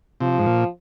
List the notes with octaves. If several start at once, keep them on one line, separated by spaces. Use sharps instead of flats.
C3 F3
G#2
A#2